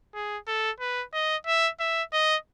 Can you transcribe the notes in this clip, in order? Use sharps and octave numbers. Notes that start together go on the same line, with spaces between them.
G#4
A4
B4
D#5
E5
E5
D#5